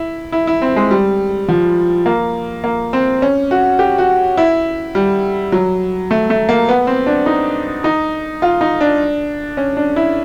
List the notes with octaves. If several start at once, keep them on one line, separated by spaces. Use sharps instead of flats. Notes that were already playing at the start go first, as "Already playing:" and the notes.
Already playing: E4
E4
E4
C4
G#3
G3
F3
A#3
A#3
C4
C#4
F#4
G4
F#4
E4
G3
F#3
A3
A3
A#3
B3
C4
D4
D#4
D#4
F4
D#4
D4
C#4
D4
E4